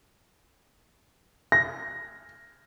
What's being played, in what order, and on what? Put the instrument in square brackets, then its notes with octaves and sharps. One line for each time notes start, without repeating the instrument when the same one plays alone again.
[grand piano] A#6